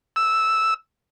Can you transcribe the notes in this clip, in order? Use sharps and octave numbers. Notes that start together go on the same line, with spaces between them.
E6